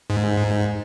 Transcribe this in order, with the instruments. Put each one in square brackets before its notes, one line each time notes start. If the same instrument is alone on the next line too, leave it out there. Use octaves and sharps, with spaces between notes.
[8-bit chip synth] G#2